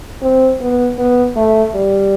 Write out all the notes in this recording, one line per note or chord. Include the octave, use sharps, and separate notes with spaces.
C4
B3
B3
A3
G3